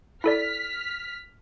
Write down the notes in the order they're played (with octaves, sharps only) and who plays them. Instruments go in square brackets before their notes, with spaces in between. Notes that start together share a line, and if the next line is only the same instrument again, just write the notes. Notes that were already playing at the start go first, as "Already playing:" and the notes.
[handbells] E4 A4 D5 [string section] F6 B6